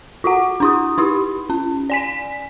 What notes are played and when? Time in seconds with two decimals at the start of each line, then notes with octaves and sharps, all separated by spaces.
0.24 F4 F#4 F#5
0.60 D4 E4 D#6
0.98 D#4 E4 G4
1.50 C#4
1.90 D5 G#5 B6